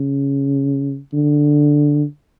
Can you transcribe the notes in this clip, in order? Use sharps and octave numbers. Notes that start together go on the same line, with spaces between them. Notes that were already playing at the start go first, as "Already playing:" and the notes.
Already playing: C#3
D3